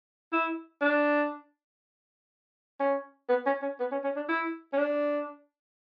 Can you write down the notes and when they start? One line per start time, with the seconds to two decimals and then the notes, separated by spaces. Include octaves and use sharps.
0.33 E4
0.82 D4
2.80 C#4
3.29 B3
3.46 C#4
3.62 C#4
3.80 B3
3.92 C#4
4.04 C#4
4.16 D4
4.29 E4
4.73 C#4
4.77 D4